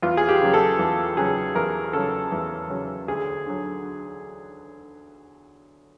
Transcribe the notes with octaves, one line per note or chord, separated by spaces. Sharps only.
E2 F4
G#4
G4
C#3 F#3
A4
E2
C#3 F#3 G#4
E2 A#4
C#3 F#3 A4
E2
C#3 F#3
D2 G#4
D3 F#3